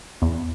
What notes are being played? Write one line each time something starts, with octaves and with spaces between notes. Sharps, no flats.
E2